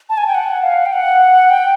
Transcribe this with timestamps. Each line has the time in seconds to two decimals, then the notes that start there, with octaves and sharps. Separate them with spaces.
0.09 A5
0.17 G#5
0.27 G5
0.35 F#5
0.63 F5
0.86 G5
0.93 F#5
1.50 G5